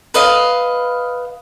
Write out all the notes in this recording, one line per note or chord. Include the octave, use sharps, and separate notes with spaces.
B4 D#5 F5